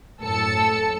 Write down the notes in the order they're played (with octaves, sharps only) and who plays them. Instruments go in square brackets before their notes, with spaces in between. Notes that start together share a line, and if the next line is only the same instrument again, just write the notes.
[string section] F#2 A2 A4 A5 E6 C#7